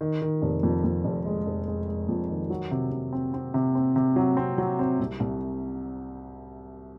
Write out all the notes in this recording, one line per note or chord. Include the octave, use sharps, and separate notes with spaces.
D#3
D#3
F1
F2
F2
F1
G#3
F1
G#3
G#3
F2
D#3
F#3
C3
C3
C4
C4
C3
C4
C3
F#3
C4
F#3
C4
C2
C2